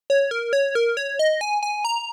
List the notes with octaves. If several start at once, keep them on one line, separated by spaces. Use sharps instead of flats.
C#5
A#4
C#5
A#4
C#5
D#5
G#5
G#5
A#5